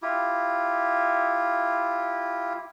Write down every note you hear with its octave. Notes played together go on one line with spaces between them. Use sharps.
E4 F4 G4